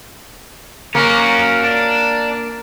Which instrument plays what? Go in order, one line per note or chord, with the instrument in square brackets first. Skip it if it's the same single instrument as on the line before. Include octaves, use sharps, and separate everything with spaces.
[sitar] A#3 [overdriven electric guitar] C#4 F#4
[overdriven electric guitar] D4